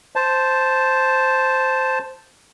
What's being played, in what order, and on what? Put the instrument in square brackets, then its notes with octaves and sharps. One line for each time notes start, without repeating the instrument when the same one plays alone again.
[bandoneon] C5 A5